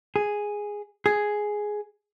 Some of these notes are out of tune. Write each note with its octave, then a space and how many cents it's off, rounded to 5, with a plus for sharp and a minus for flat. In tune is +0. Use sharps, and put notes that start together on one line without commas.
G#4 -5
G#4 +5